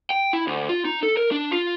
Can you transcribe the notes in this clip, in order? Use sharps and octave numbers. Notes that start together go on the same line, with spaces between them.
G5
E4
D2
F4
D#4
A4
A#4
D4
F4